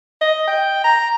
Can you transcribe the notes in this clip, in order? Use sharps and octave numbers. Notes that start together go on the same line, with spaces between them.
D#5
G5
A#5